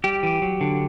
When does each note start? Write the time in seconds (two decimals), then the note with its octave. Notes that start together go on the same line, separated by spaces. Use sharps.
0.04 G3 G4
0.23 E3
0.42 F#3
0.61 D3